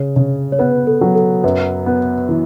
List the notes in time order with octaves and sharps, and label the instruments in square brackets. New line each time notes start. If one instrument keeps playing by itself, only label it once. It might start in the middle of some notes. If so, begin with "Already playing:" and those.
Already playing: [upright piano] C#3 [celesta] C#5
[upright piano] C#3
[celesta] C#5
[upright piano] B3 [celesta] B4
[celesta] A4
[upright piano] F#3
[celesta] A4
[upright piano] F#2 [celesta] B4
[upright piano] B3
E3